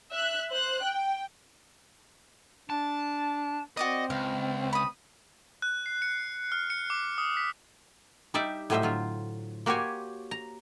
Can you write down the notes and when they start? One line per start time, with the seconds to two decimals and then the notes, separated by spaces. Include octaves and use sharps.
0.13 E5 F#6
0.52 C5 F#6
0.84 G5
2.70 D4 A5
3.77 C4 F#4 D5 D#5 D#6
4.10 C#2 F5
4.73 B5 D#6
5.62 F#6
5.86 C7
6.02 C#7
6.52 F6
6.70 C#7
6.90 D6
7.18 D#6
7.37 B6
8.34 G3 D#4 G4 D5 E5
8.70 A2 F#3 G3 C5 D#5 E5
8.82 D3 F#3 F4
9.66 A#3 F#4 G4 C5 C#5 G#5
10.31 A#5